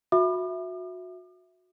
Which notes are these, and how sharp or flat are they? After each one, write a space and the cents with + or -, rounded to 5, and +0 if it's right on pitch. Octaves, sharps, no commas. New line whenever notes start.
F#4 -25 E5 +0 D6 +45